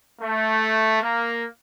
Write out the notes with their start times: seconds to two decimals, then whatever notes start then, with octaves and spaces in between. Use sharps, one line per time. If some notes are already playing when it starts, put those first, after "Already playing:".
0.21 A3
1.02 A#3